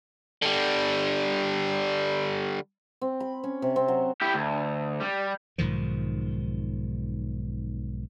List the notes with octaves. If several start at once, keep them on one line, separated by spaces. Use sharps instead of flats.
D3 G3
C4
B5
C#4
C3
C4
F#3
E4 G4
D2
G3
B1 G#2 D#3 F3